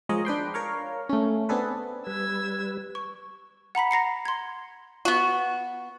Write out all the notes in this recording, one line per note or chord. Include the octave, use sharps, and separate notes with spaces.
F3 G#3 A#4 C#5 D#5
D4 B4 G5 C6
A#4 C#5 F5
A3 C#4
B3 C4 D4 G#4 A4 B4
G3 B4 E6 G#6
C#6
F#5 A#5 B5 B6
A#5 A#6 C7 C#7
C6 G#6
B3 F#4